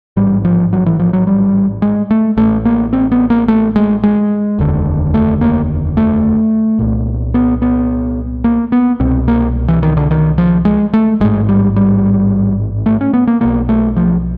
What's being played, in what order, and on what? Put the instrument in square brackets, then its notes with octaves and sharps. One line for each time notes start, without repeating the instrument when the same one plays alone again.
[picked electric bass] A1 G#2 G3
F3
F#3
E3
F3
F#3
G3
G#3
A3
A1 A2 A3
A#3
C4
B3
A#3
A3
G#3
G#3
F1 D#2 D3
A3
A#3
A3
C2 A#2
B3
B3
A#3
B3
C2 B2 C4
A#3
E3
D#3
D3
D#3
F3
G#3
A3
A1 G#2 G#3
G3
G3
A3
C#4
B3
A#3
B1 B2 A#3
A3
F3